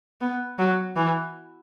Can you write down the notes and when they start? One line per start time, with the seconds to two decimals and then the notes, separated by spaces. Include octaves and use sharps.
0.21 B3
0.58 F#3
0.96 E3